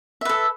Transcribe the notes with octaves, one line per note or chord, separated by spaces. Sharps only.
A4 B4 E5